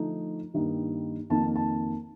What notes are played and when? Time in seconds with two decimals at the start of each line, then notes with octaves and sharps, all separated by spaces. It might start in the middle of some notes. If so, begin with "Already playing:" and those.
Already playing: D3 F3 A3 D#4
0.54 G2 D#3 G3 A#3 D#4
1.30 F2 D#3 A#3 D#4 A5
1.56 A5